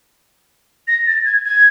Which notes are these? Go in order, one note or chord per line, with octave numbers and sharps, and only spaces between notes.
A#6
A6
G#6
G#6